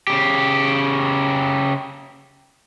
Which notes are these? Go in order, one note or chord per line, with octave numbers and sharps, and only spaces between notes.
C#3 G4